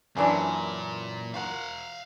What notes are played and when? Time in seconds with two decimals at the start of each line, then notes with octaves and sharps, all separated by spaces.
0.17 F#2 A#2 E3 C#4 D4 G#4
1.34 F3 F#4 A#4 F5 F#5